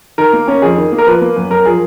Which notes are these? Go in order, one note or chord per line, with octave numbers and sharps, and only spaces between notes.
D#3 A#4
A#3
C#4
F2 G#4
D#3
A#3
A#4
F3 B4
A#3
F#2
F#2 A#4
F3 G#4